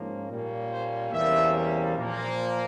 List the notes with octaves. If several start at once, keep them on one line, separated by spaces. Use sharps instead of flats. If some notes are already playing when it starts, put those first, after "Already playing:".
Already playing: G#2 F3 A#3 C#4
A#2 G3 A#3 C#4
C5
E2 C3 G3 A#3 C#4 E5
A#2 F3 A#3